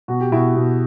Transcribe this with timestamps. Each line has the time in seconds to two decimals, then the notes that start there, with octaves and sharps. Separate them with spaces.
0.08 B2 F#4
0.20 G4
0.32 B2 E4 F#4
0.55 B2